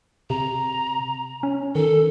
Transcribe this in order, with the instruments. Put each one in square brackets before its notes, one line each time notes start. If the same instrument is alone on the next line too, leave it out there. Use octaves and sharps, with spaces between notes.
[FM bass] C3 [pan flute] A#5
[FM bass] C#4
[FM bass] D#3 [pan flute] A4